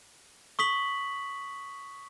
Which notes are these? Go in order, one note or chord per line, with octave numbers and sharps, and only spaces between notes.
C#6 D#6 B6 F#7